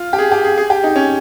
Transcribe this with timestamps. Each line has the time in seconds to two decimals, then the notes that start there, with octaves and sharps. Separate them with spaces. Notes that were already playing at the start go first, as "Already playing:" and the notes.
Already playing: F4
0.13 G4
0.18 G#4
0.32 G4
0.44 G#4
0.58 G#4
0.70 G4
0.83 D#4
0.96 C#4